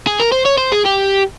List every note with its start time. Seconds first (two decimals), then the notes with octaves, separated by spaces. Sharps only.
0.07 G#4
0.20 A#4
0.32 C5
0.46 C#5
0.58 C5
0.72 G#4
0.86 G4